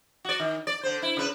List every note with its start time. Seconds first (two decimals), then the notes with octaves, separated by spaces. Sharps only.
0.25 F#4 D5
0.40 D#3
0.67 D5
0.83 D3 C5
1.02 E4
1.17 C#3 B4